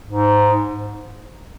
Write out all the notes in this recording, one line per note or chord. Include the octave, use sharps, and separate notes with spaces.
G#2